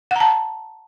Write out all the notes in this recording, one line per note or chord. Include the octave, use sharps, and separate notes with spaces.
F#5 A5 A#5